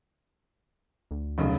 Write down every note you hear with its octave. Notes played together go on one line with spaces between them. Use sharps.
D2
F1 B1 C#3